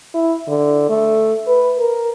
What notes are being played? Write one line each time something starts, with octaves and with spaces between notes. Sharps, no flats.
E4
D3
A3
B4
A#4